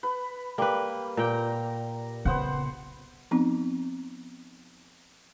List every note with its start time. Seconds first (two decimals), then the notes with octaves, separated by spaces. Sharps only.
0.03 B4
0.58 G3 A#3 B4
1.17 A#2 G5 A#5
2.25 C#3 B3 C5 F#5
3.31 F3 B3 C4 D#4